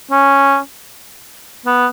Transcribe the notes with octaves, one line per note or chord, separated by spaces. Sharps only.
C#4
B3